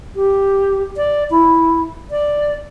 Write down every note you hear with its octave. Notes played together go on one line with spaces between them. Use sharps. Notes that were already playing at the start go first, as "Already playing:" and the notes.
G4
D5
E4
D5